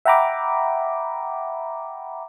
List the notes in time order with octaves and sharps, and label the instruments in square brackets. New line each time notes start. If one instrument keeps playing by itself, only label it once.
[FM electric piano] E5 F#5 G5 A#5 B5 D6